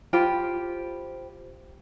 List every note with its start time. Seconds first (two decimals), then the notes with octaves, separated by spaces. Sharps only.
0.13 F4 G4 C5 B5